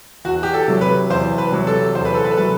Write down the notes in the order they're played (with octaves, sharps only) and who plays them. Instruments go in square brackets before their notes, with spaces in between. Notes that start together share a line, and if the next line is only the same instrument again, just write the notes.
[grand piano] E2 [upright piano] F#4
[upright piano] G4
A4
[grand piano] C3 F#3
[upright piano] B4
[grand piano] E2 [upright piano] C5
[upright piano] B4
[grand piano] C3 F#3
[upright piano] A4
[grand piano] E2 [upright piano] C5
[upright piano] B4
A4
B4
A4
[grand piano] C3 F#3 [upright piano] B4